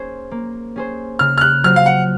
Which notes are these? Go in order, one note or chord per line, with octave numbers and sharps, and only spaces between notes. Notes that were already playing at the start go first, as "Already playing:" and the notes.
Already playing: A#3 C#4 G#4 C5
A#3
C#4 G#4 C5
C#3 F6
F6
F#6
F#3 C4 F4 C5 F6
F5
F#5